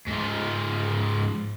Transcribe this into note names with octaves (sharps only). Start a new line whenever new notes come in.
G#2 F3